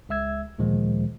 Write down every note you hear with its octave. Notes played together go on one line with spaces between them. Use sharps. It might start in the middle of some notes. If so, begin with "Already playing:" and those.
C#2 G#3 E5 E6 G#6
D2 A#2 D#3 F3 G#3